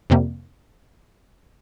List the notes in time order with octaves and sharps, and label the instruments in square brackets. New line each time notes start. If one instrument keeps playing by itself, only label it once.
[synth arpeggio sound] F2 C3 G3 A#3